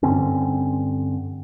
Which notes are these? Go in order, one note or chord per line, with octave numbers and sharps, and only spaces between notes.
G2 D3 C4 C#4